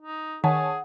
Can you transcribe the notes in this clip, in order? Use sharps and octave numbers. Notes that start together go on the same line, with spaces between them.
D#4
D#3 G#4 C#5 F#5 G#5 A5